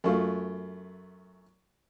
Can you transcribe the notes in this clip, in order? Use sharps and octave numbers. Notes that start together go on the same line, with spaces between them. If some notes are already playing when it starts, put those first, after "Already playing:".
F#2 A3 F4